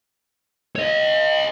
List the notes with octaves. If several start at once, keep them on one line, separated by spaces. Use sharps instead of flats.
C#5 D#5